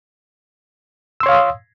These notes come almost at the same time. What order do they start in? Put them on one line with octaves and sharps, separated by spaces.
E6 C6 C#5 F5 D#6